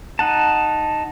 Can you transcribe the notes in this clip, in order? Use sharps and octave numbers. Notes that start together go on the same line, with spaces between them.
D#4 F#5 A5